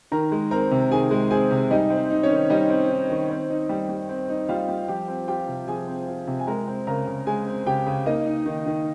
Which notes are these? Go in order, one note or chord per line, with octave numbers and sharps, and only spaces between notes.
D#3 A#4 A#5
G#3
C4 A#4 A#5
C3
D#3 G#4 G#5
G#3
C4 G#4 G#5
C3
G3 D#4 D#5
C4
C5
D#4
C#4 C#5
D#3
G3 D#4 D#5
C4
D#4
D#3
C4
D#4
G3
G3
C4
D#4
G3 F4 F5
G3
F3 G4 G5
C4
F4 G4 G5
C3
F3 G#4 G#5
C4
F4
C3
G#5
G#3 A#4 A#5
C4
C#3 A#4 A#5
C#3
G#3 G#4 G#5
C4
C#3 G4 G5
C#3
A#3 D#4 D#5
D#4
D#3
D#3